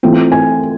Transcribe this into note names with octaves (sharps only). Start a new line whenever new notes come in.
E3 A3 C4 F4
G#5